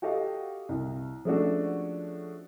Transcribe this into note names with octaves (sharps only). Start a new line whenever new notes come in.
F#4 G4 A4 D#5 F5
C2
F3 G#3 A3 C#4 D4 F#4